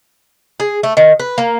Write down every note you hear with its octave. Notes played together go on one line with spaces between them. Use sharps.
G#4
A3
D#3
B4
A#3